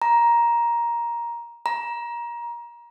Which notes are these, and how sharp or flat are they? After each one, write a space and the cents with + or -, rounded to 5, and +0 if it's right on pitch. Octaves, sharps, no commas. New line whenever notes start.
A#5 +10
A#5 +25